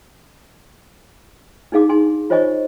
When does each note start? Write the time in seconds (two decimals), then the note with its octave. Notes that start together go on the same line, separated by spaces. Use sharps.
1.72 D4 D#4 G#4 F5 D6
1.89 D#4 G#5 C6
2.30 F4 C5 C#5 D#5 G#5 C#6